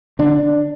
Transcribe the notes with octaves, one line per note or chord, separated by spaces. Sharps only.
D3 D4